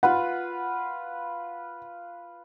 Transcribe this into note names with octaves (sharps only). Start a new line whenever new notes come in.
F4 B4 F#5